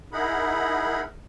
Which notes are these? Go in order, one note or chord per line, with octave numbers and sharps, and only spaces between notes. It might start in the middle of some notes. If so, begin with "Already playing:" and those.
D#4 E4 G#4 A#4 F#5 B5